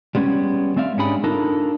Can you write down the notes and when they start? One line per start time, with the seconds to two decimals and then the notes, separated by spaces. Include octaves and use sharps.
0.15 G3 G#3 B3 C#4
0.76 G#3 C4 D5 E5 F5
0.97 G#2 C#4 D4 G4 G#4 B5
1.24 D4 D#4 F4 A4 A#4